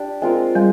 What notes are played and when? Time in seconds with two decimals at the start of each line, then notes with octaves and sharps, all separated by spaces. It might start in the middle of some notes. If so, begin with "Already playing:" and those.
Already playing: D4 G4
0.22 G#3 C4 F4 A#4
0.55 G3 G#3